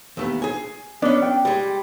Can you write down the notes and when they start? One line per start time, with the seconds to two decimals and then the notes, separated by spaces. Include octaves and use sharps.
0.17 D#2 A3 B3
0.42 G#4 G#5
1.02 B3 C#4 D4
1.22 G5
1.45 G3 G#3